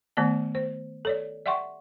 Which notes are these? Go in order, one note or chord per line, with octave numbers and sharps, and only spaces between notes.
D#3 A3 B3 D5 A5
C5
A4 C#5 D5
D5 E5 F#5 G5 C6 C#6